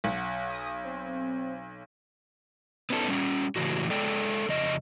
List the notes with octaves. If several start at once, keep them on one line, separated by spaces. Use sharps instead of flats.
B1 F#5
D#6
C4
B3 C#4 D#4 G4 A4
G3 C#4
A2 C#3 E3 F#4
G#3 A4 D5 G5
F2 C#3 D#5